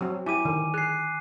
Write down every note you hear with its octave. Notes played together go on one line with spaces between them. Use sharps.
F#3 C4 F#4
E4 G4 G#5 D6 D#7
D3 D#3
G#4 F#6 C7